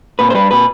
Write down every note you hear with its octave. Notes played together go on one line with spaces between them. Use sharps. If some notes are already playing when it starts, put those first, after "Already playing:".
A#2 B4
C5
G3 B4
A#2 B4